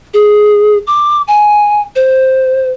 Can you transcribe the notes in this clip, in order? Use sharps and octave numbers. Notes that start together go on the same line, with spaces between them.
G#4
D6
G#5
C5